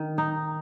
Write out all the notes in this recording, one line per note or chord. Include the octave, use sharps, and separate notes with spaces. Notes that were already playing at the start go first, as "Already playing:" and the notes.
Already playing: D#3
D#4